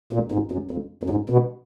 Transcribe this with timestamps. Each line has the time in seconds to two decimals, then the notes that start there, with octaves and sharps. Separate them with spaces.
0.13 A#2
0.32 G#2
0.52 F#2
0.71 F2
1.03 F#2
1.10 G#2
1.30 B2